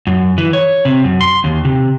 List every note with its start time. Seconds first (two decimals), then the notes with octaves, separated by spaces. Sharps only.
0.07 F#2
0.38 E3
0.53 C#5
0.85 C3
1.04 F#2
1.21 C6
1.44 D#2
1.65 C3